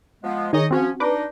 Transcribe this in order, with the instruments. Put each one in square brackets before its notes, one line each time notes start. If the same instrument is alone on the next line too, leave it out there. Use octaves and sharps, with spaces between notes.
[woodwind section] F3 G#3 B3
[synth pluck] D#3 G#4 [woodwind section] D#4 C#5 D#5
[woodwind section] F3 C#4 [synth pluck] C4 F#4
[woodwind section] D4 D#4 [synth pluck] B4 D6